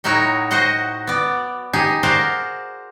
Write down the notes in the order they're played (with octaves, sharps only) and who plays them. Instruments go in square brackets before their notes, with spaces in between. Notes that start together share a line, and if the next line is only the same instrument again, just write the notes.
[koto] A2 F#3 D#4 E4 F#4 C#5
F#4 C5 D#5 F#5
B3 D5
D#4 G4 G#4 G#5
F#4 A#4 C5 D5 F5 F#5